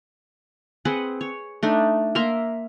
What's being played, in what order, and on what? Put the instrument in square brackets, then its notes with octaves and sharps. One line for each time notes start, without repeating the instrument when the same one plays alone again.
[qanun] C4 G#4 B4 F#5
C#5
A3 D4 D#4
A#3 E5 A#5 C6